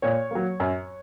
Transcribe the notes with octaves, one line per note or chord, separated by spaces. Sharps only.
A#2 C#5
F#3 A#3
F#2